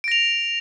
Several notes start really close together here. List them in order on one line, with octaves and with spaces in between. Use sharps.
D7 A#6 F7